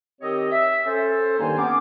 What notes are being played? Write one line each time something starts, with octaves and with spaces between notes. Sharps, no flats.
D#3 C4 G4 C#5 D#5
E5
C#4 A4 C5
G2 D#3 A#3 D#4 C5 G#5
B3 C#4 D6